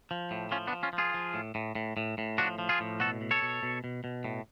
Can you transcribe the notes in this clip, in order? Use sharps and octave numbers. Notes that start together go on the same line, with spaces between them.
F3
A2
F3 C#4 F4
B3 D4
F3
C#4 F4
F3
F4 G#4
F3
A2
A2
A2
A2
A2
F3 D4 F#4
F3
F4 G#4
A2
B2 F#4 A4
B2
A4 C#5
B2
B2
B2
B2
A2